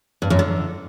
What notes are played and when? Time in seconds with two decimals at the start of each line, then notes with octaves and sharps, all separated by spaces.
0.22 G2
0.30 F#2
0.39 D3